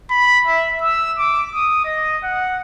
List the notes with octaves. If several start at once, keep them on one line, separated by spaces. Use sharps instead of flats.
B5
E5
E6
D6
D#6
D#5
F#5